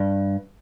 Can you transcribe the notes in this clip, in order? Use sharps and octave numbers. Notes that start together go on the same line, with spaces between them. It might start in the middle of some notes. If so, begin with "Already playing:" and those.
Already playing: G2